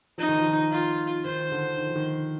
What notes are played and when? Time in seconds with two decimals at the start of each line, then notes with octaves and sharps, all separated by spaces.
0.18 F3 D#4
0.29 D#3
0.39 F3
0.72 F4
1.25 D#3 C5
1.52 D3
1.78 D#3
1.86 F3
1.96 D#3